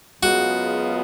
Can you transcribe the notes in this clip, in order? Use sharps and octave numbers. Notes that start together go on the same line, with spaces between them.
F#2 C#3 G#3 B3 F4 F#4